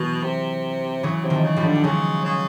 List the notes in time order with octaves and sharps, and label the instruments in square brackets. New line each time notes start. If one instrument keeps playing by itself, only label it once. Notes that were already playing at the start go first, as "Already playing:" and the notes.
Already playing: [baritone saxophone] B2 [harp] E3 F#3
[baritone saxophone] C3
[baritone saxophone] C#3 [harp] E3 F#3
[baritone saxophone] C3
[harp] D#3 F3
[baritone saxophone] C#3
[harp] F3 G3
[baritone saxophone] D3
[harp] G3
[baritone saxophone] C#3 [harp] F#3 G#3
[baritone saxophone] C#3